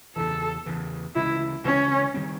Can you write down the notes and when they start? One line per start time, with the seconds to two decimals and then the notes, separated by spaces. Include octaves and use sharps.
0.16 E2 C#3 E3 A4
0.66 E2 C#3 E3
1.15 D2 C#3 E3 G#3 E4
1.64 D2 C#3 E3 G#3 C#4
2.14 D#3 G3 C4